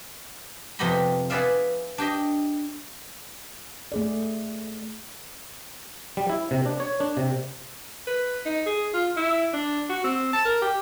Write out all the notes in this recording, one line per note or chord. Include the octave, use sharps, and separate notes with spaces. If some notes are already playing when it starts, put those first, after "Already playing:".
F2 C3 B3 G4 D#5 B5
B3 G#4 B4 D5 E5 F5
D4 G4 D#5
A3 G#4 D5
G3
E4
C3
D4
C#5
D4
C3
B4
D#4
G#4
F4
E4
D4
F#4
C4
A5
A#4
G4